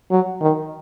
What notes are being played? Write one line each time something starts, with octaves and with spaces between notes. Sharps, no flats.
F#3
D#3